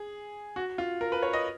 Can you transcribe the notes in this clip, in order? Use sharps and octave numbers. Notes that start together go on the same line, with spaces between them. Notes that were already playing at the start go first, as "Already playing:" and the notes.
Already playing: G#4
F#4
F4
A#4
B4
C#5
D#5